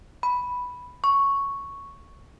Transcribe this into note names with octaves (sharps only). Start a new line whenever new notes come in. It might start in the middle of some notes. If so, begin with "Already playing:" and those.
B5
C#6